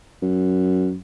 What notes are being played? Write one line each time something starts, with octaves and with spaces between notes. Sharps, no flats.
F#2